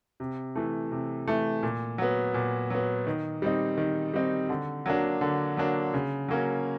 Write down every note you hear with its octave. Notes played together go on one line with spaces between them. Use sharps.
C3
E3 A3
C3
E3 A3
A#2
F#3 B3
A#2
F#3 B3
D#3
G3 C4 D#4
D#3
G3 C4 D#4
D3
F#3 A#3 D4
D3
F#3 A#3 D4
C#3
F#3 A#3 C#4